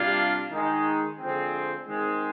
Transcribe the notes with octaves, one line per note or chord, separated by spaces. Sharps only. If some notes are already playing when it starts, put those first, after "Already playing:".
Already playing: C3 G3 A#3 D4 F4
D#3 G#3 D#4
D3 F3 G#3 C4
D#3 G#3 C4